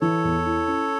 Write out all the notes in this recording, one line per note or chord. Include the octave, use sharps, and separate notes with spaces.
E3 A4 C#5
E2
E4
C#4